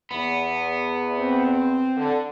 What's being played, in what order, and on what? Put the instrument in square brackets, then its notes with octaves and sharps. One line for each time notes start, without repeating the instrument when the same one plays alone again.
[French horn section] E2 [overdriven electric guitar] B3
[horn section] C4
[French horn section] D3